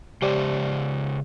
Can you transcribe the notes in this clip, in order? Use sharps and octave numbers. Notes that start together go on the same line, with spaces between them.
C#3 G#3 G4 C5 D5